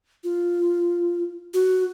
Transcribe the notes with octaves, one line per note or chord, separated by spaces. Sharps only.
F4
F#4